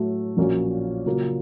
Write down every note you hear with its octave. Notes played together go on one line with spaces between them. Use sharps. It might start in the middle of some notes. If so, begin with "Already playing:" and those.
Already playing: A2 F#3 A3
A#1 A#2 F#3 A#3 C#4
C#3 F#3 A#3 F4